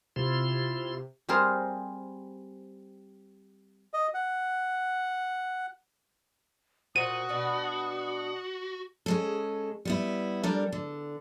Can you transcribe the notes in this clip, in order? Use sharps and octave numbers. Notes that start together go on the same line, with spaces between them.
C3 E4 F4 C6
G3 C4 G#4 A#4 C5 F5
D#5
F#5
A#2 F#4 C5 D#6 D#7
B2 D4 B4
C#3 G#3 A4
G3 B3 E4
G3 D4 A4 A#4
D3